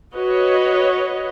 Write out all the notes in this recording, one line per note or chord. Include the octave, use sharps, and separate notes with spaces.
F#4 B4 C#5 D#5